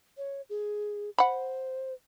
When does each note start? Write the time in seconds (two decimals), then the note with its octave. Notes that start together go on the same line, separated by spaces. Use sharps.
0.18 C#5
0.50 G#4
1.18 C5 F#5 B5